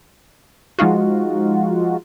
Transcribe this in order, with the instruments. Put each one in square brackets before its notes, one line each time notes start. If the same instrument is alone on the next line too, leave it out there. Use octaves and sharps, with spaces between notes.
[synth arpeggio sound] F3 G#3 D#4 F4 F#4